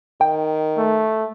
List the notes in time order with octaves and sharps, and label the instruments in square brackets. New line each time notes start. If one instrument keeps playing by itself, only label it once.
[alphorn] D#3 [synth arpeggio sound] G5
[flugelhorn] A3